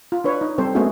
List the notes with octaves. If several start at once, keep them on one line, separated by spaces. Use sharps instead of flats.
F4
D4 B4 C#5
D#4
G3 C4 A4 C5
G#3 A3 B3 C#4 F#4 G#4